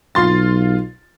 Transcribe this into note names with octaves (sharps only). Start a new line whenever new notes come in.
B1 F4 C6 A6